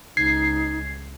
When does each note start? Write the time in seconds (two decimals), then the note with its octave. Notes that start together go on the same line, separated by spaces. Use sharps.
0.17 C#2 D#4 G#6 C7